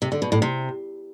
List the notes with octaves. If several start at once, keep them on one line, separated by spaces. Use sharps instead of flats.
C3
D3
B2
A2
C3